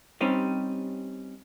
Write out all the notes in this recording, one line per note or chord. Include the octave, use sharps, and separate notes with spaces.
G3 C4 C#4 D#4 G4